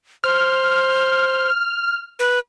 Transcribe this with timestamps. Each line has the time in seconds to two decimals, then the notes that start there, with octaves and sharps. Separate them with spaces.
0.24 C5 F6
2.19 B4